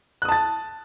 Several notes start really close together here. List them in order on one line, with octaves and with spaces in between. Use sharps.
F#6 D#6 A5 A6